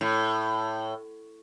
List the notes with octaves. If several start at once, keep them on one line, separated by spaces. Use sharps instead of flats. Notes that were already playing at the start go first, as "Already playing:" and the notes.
A2